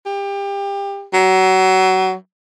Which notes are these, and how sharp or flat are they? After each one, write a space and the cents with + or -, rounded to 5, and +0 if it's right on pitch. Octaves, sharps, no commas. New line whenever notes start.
G4 +25
F#3 +25